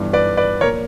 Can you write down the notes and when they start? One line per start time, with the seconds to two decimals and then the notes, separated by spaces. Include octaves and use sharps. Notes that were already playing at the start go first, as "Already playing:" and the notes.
Already playing: G1 G2 E3
0.13 B4 D5
0.37 B4 D5
0.61 A#1 A#4 C#5
0.64 A#2